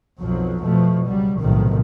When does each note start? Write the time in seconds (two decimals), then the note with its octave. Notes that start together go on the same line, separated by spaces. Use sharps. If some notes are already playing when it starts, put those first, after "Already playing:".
0.21 B1 F2 B2 F3 F#3
0.62 B2 F3 A3
1.06 C#2 F#3 G3
1.39 B1 A2 C3 D#3 F3